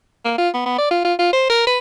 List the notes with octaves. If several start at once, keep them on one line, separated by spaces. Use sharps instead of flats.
A#3
F4
B3
B3
D5
F4
F4
F4
C5
A#4
B4